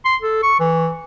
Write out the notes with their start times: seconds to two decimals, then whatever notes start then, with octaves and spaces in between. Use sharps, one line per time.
0.05 C6
0.22 A4
0.43 C#6
0.60 E3